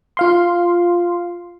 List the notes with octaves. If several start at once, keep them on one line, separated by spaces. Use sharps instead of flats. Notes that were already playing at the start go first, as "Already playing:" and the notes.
F4 F5 C6